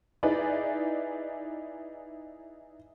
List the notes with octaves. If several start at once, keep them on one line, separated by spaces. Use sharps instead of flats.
D#4 E4 G#4 B4 D5